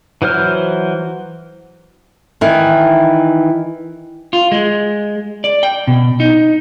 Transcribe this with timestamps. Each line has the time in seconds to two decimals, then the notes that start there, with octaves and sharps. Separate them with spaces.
0.22 E3 F#3 C5 F6
2.41 D#3 E3
4.33 F4
4.52 G#3
5.44 D5
5.63 G5
5.87 B2
6.20 D#4